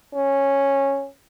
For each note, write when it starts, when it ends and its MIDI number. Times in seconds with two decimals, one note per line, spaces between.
0.14 1.07 61